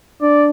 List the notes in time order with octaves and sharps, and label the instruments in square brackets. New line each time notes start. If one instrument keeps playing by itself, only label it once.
[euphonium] D4 [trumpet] D5